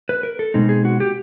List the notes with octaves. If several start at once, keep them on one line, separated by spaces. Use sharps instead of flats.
B4
A#4
A4
B2 G#3 C4 D#4
G#4
F#4
G4